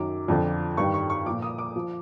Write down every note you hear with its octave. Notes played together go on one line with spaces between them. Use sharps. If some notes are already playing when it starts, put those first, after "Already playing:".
Already playing: F#2 D#3 F#3 D6
F2 D3 F3
G2 D#3 G3 C#6
C#6
C#6
A#2 F3 D6
D#6
D6
F3